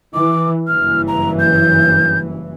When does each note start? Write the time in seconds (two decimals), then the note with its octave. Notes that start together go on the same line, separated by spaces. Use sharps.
0.14 E3 D6
0.67 F#1 G2 E3 F6
1.08 A#5
1.40 G6